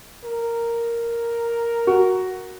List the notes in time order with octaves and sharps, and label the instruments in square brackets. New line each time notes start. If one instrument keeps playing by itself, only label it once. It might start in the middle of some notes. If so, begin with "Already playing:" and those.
[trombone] A#4
[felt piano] F#4